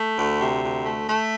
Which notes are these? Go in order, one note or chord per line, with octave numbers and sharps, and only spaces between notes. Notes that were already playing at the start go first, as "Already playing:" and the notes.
Already playing: A3
D2
C3
D2
A3
A3